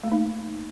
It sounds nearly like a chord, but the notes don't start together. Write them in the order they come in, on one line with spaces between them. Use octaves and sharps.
A3 A#3 D#4